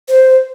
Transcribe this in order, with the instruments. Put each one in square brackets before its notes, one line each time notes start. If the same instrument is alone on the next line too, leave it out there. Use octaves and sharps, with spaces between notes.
[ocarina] C5